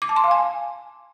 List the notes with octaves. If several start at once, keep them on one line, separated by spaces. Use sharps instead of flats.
D6
A5
C6
F5
G#5